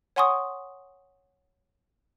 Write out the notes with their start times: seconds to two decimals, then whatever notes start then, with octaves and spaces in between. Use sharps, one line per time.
0.16 C#5 F#5 G#5 C6 C#6 D#6